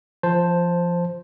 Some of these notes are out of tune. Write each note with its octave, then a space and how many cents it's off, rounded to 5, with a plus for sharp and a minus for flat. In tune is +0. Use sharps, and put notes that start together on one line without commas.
F3 -15 C5 +0 A5 +0